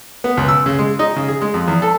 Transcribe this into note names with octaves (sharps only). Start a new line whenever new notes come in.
B3
C#2
E6
C#3
G#3
D#4
C#3
G#4
G#3
F2
E2
A4